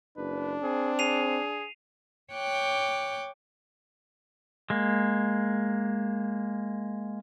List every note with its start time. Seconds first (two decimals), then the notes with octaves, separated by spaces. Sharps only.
0.17 F#1 D4 B4
0.63 C4 G#4
0.99 G#4 C7 D#7 F7
2.33 C#5 G5 D6 F#6 G6
4.70 G#3 A#3